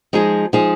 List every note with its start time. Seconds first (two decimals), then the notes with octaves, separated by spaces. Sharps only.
0.13 F3 G#3 D#4 G#4
0.53 F3 G#3 D#4 G#4